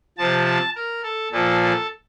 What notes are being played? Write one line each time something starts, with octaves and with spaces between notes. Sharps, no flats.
C3 F3 A5
A#4
A4
A#2 F3 A4
A4